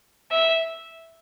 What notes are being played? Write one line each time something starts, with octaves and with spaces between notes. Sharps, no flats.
E5